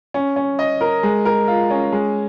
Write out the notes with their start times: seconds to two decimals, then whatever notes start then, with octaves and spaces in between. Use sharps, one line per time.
0.14 C#4
0.36 C#4
0.59 D#5
0.81 A#4
1.03 G#3
1.25 A#4
1.48 F4
1.70 C#4
1.92 G#3